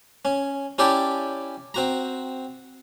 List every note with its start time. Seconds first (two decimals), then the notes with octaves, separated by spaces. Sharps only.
0.25 C#4
0.78 C#4 E4 G4 D5 G5 A5
1.74 C4 F#4 A#5